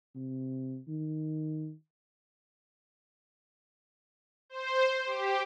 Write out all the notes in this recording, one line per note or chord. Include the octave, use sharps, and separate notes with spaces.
C3
D#3
C5
G4